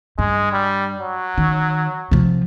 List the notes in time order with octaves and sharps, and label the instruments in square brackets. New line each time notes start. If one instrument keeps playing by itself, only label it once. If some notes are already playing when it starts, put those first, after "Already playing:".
[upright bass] G2 [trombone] G#3
[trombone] G3
F#3
[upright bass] D#3
C3 F3